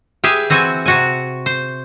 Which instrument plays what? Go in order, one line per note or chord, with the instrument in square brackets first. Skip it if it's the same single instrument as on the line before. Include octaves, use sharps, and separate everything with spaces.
[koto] G4 G#4 B4 E5
E3 C4 F#4 G#5
C3 F#4 G#5
C5